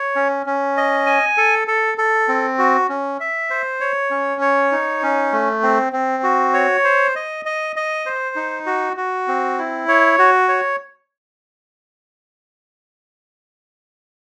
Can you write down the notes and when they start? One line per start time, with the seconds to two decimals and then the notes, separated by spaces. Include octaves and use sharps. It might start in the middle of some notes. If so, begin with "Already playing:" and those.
Already playing: C#5
0.15 C#4
0.46 C#4
0.77 D#5
1.06 G#5
1.37 A4
1.68 A4
1.98 A4
2.28 C4
2.58 F#4
2.89 C#4
3.20 E5
3.50 C5
3.80 C#5
4.10 C#4
4.41 C#5
4.72 D#4
5.03 C#4
5.32 A3
5.63 C4
5.93 C4
6.23 F#4
6.54 C#5
6.84 C5
7.15 D#5
7.45 D#5
7.76 D#5
8.06 C5
8.36 D#4
8.66 F#4
8.97 F#4
9.28 C4
9.59 E4
9.88 C#5
10.19 F#4
10.49 C#5